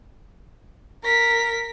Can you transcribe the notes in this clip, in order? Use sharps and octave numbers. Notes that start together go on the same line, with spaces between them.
A#4 B6